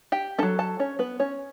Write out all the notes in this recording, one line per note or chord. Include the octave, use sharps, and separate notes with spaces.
G4 G5
F#3 C#4 A4 A5
A4 A5
C#4 C#5
B3 B4
C#4 C#5